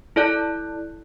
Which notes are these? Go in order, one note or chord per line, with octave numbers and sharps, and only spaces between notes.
E4 A4 D5 A5 F#6